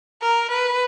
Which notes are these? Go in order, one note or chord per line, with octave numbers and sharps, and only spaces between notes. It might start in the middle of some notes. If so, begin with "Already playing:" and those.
A#4
B4